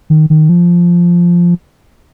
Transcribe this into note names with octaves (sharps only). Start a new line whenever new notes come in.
D#3
D#3
F3